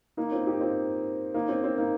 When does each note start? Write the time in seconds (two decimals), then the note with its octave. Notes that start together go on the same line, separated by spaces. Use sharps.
0.17 A#3 D#4
0.32 C4 F4
0.47 D#4 G4
0.61 C4 F4
1.34 A#3 D#4
1.49 C4
1.64 C4
1.78 A#3 D#4